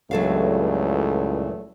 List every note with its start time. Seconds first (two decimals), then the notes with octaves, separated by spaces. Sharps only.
0.11 C#2 G2 A#2 E3 F#3 A3 A4 F5